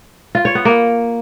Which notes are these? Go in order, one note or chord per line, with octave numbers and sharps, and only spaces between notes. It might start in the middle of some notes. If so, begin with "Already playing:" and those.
F4
C#5
B3
A#3